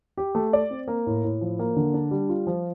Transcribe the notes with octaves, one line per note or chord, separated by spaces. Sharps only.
G4
A3
D5
C4
A#3
A2
A2
F3
A#3
D3
D4
G3
F4
F3